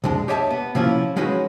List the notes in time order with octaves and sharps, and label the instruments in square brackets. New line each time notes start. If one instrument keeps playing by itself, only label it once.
[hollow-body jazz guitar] C2 F2 G#3 D4
G4 C#5 D#5 E5 G#5 A5
B3
C3 F3 A#3 C#4 E4 F4
F#3 G#3 C#4 D#4 F#4 B4